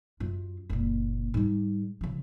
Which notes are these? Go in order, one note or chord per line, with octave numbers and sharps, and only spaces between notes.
F#2 F4
F#1 A#2
G#2 G3
C#3 F3